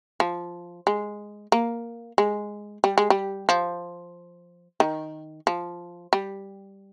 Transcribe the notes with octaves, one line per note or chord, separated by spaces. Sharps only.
F3
G#3
A#3
G#3
G3
G#3
G3
F3
D#3
F3
G3